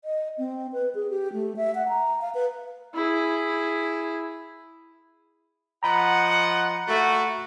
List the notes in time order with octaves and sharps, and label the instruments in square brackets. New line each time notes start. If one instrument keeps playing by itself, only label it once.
[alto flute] D#5
C4
B4
G#4
G4
A3
E5
F#5
A#5
F5
B4
[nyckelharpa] E4 G#4
[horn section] F3 D#5 F#5 [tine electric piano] A#5 B5
[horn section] A3 F#4